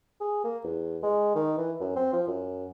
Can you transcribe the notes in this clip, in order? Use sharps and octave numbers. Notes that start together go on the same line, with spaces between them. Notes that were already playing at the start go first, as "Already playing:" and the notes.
G#4
A#3
E2
G#3
D#3
E3
F#2
C4
F3
F#2